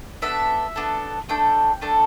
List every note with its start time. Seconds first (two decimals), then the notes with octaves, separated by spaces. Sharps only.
0.22 B3 D4 A4 E5
0.76 B3 D4 A4
1.29 A3 D4 A4 G5
1.82 A3 D4 A4